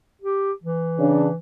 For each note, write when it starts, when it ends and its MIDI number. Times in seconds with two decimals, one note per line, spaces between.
0.22 0.52 67
0.63 1.37 52
0.99 1.27 49
0.99 1.27 62